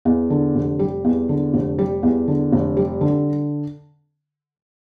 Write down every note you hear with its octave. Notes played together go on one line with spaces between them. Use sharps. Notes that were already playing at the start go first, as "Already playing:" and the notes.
E2
D3
F1
G3
E2
D3
F1
G3
E2
D3
F1
G3
D3